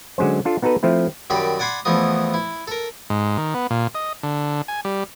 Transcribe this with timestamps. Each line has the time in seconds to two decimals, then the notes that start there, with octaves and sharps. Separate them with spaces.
0.18 D3 F#3 G#3 C#4 C5
0.45 D4 F4 A4
0.62 B3 D#4 F#4 A4 B4
0.83 F3 A3 C4 E4
1.30 F#2 D#3 G3 G4 D5 B5
1.59 D5 F#5 G#5 B5 C6 D6
1.85 E2 E3 F3 A3 B3 D#5
2.34 E4
2.67 A4 A#4
3.10 G#2
3.38 D#3
3.54 B3
3.71 A#2
3.95 D#5
4.23 D3
4.68 G#5
4.85 G3